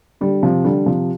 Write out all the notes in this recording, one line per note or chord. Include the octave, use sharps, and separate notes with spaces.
D3 G3
C3 F3
D3 G3
C3 F3